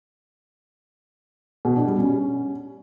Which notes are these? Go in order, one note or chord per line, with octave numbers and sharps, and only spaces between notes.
B2
D4
G3
C#4